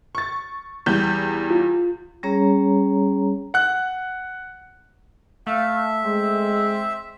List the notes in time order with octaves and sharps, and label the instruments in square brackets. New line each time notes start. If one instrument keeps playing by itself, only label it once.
[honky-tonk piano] C#6 A6
E2 G3 G6
[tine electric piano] F4
[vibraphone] G3 C#4 G#4 C#5 A#5
[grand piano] F#5 F#6
[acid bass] A3 [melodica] E5 [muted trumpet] F5
[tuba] G#3 [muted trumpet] C4